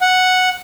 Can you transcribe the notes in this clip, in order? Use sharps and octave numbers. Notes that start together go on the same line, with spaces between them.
F#5